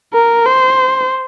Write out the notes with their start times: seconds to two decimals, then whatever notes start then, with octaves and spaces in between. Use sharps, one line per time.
0.13 A#4
0.46 C5